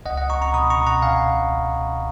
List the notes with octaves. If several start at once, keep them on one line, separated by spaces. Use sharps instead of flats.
C#2 D#5 F#5
D#5 F#5
C#2 A#5 C#6
A#5 C#6
B2 B5 D#6
A#5 C#6
B2
F#5 A#5
B2 F5 G#5